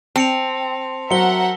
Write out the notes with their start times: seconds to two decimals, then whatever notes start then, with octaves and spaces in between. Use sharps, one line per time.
0.16 C4 A5 C#7 F7
1.10 F#3 A#4 C5 E5 F#5 C#7 G7